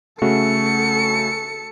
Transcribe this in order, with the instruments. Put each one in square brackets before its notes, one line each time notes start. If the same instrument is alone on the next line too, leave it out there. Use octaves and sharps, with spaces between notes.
[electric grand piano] C#3 A3 F#4 [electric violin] A4 C#7